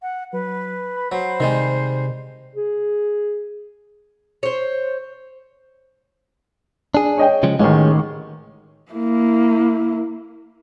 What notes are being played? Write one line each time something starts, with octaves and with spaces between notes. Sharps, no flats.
F#5
F#3 B4
B5
F#3 C5
C3 D#3 G3 G#3
G#4
C5 C#5
D4 G#4
C#5 D#5 G5
C#3 F3 G#3
A1 D#3 G#3 C#4
A#3 E4